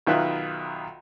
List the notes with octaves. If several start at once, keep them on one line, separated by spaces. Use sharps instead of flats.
B1 D#3 F4 B4 E5